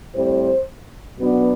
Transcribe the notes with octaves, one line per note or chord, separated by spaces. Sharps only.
A2 G3 C4 C5
B2 F#3 B3 D4